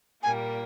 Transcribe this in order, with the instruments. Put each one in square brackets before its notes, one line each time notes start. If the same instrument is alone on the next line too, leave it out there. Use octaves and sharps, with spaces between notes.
[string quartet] A#2 G3 A#3 [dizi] G#5